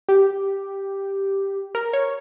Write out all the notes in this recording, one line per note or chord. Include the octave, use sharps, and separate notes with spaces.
G4
A#4
C#5